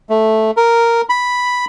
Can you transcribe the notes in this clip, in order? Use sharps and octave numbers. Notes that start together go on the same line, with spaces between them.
A3
A#4
B5